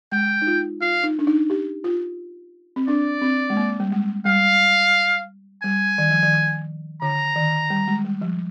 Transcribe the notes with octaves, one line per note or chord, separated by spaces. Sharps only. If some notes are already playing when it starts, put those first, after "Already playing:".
G#3 G5
D#4
F4
F4 F5
D#4
D4
D#4
G4
F4
C4
D4 D5
C4
G#3
A#3
G3
G#3
G3 F5
G3 G#5
D#3
F3
D#3
D3 A#5
D#3
G3
G#3
G3
F3